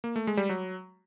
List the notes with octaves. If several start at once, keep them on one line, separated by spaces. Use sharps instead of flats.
A#3
A3
G#3
G3
F#3